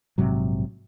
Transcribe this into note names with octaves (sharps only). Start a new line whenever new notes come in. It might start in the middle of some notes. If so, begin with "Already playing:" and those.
A#1 G#2 C3 F#3